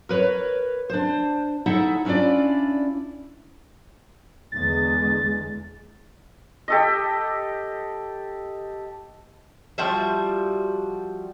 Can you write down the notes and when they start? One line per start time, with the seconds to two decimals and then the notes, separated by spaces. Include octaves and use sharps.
0.09 A#4 B4 C#5
0.90 D4 C5
1.66 D#4 E4 A4 E5 F#5
2.05 C#4 D4 E4 F4 D5
4.52 E2 D3 G#3 A6
6.68 G4 A4 D#5
9.78 F3 G3 F#4 E5